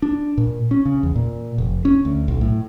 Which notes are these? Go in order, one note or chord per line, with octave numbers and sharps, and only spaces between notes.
D4
A#2
C#4
C#3
E2
A#2
F1
C#4
D2
B1
A2